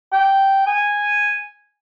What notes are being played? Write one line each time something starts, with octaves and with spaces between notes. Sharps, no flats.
G5
G#5